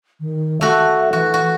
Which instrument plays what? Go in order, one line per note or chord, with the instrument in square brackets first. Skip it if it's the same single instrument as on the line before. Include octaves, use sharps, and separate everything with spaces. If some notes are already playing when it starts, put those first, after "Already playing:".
[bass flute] D#3
[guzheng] A3 F#4 [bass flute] E5
[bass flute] E3 [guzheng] F#4
[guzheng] F#4